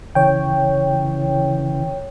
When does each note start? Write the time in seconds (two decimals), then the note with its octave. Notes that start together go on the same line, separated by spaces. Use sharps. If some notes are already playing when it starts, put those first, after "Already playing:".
0.15 C#3 E3 C#5 G5